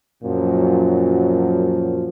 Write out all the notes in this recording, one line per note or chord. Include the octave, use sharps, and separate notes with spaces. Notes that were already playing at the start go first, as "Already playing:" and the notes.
F#2 A#2 F3 F#3